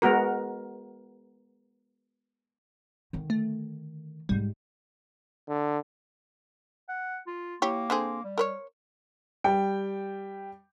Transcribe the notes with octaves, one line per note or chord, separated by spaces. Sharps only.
G#3 B3 F#4 A#4
D3 D#3
A3
G#2 G3 G#3
D3
F#5
F4
A#3 E4 G4 C#5
D3 C4 G#4
G3
A#4 B4 C#5
G3 G5